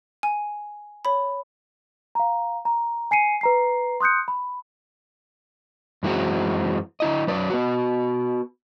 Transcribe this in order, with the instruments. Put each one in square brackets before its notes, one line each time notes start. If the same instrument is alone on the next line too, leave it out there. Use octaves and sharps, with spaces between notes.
[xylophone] G#5
C#5 B5
[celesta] F5 A#5
A#5
G#5 C7 C#7 D#7
B4 A#5 C7
C6 D#6 F#6 G6 C#7
B5
[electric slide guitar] F#2 E3 G#3 C4 F#4
D3 E4 D#5
F#3 B4 D5
B3 F#4